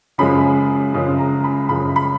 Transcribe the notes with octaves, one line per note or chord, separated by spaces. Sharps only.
F#2 C#3 F3 G#3 B5
F#2 C#3 F3 G#3
A#5
B5
F#2 C#3 F3 G#3 B5
B5